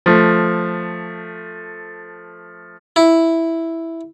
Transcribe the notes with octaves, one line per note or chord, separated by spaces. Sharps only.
F3 A3
E4